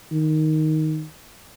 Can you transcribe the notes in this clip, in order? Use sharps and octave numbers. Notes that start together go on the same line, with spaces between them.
D#3